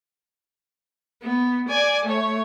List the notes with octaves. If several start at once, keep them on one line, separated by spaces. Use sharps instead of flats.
B3
D5 G#5
A3 C#5